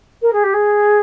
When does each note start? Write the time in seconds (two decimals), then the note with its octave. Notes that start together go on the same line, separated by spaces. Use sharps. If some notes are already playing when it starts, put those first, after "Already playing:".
0.22 A#4
0.32 G#4
0.43 G4
0.53 G#4